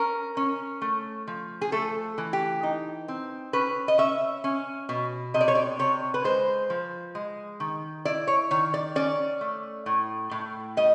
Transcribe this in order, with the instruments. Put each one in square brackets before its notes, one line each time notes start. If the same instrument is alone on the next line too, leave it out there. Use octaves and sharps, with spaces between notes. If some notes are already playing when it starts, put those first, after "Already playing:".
Already playing: [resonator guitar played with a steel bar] C#4 A#4
C#4
A3
F3
G#4
A3 A4
E3
G4
D#4
C4
C#4 B4
D#5
C#4 E5
C#4
B2
C3 D#5
D5
C#5
D5
C3 C#5
B4
G#3 C5
F3
G#3
D#3
E4 D5
C#5
D#3 C#5
D5
C#4 D5
A3
A2
A2
G3 D#5